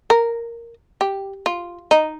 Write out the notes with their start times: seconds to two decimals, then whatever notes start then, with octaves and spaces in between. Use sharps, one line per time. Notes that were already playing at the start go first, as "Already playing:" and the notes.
0.10 A#4
1.01 G4
1.46 F4
1.91 D#4